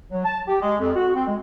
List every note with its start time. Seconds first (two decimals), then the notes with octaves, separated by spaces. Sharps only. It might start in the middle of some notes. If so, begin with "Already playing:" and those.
0.11 F#3
0.25 A5
0.48 G4
0.61 G#3
0.80 F2
0.96 F#4
1.15 C4
1.28 G#3